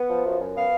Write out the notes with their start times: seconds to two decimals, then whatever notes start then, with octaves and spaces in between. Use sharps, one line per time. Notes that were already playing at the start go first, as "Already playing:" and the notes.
Already playing: B3
0.10 F3
0.24 F#2
0.40 F#2
0.55 B3 F5